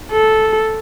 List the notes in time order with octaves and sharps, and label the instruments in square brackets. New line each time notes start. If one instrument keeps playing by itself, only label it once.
[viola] A4